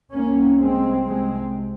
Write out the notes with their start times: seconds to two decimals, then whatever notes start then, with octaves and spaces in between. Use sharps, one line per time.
0.14 C2 C3 A#3 C#4
0.60 G#3 C4
1.06 G#3 C4